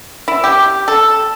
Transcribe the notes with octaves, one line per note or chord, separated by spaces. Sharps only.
E4
G4
A4